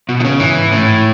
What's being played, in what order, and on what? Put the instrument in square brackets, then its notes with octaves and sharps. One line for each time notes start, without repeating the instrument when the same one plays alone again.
[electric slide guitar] B2
D#3
C#3
[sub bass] G#2 [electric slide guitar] E3
[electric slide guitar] A2